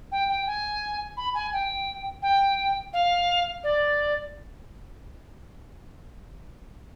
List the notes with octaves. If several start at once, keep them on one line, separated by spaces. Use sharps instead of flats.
G5
G5
G#5
B5
G#5
G5
G5
F5
D5